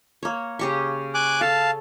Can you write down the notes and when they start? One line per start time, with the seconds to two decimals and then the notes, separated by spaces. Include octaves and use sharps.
0.23 A#3 C#5
0.59 C#3 G4 C#6
1.14 G#5 D6 F#6
1.41 A4 F5 A5